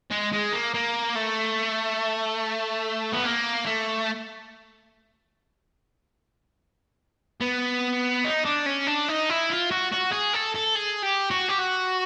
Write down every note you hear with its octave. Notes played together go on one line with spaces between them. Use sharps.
G#3
G#3
A#3
A#3
A3
B3
A#3
A3
B3
D#4
D4
C#4
D4
D#4
E4
F4
F#4
F#4
G#4
A4
A4
G#4
G4
F#4
G4
F#4